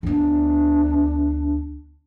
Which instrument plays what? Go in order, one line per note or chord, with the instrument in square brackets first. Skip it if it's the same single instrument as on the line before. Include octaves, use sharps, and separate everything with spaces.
[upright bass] D2 B3 [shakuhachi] D4